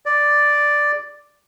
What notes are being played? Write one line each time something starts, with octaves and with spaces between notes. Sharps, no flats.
D5